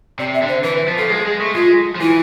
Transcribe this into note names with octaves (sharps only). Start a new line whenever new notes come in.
C3 D5
E5
D3
C5
E3 B4
F3
F3 A4
G#3 G#4
G#3
A3
G#3 F4
F3
E3 E4